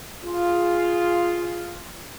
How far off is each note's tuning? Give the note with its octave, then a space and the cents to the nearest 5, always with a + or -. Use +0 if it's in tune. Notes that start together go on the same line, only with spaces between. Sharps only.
F4 +0 G#4 +0